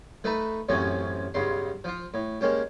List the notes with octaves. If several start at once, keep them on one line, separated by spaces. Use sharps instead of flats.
A3 D#4 B4 A5 A#5
A1 F#2 A2 C3 C#4 G#5
B1 G2 C#3 C6
F3 F4
A2
G#3 A#3 C#4 G4